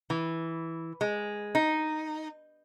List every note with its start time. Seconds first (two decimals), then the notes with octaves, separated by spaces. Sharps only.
0.10 E3
1.01 G#3
1.55 D#4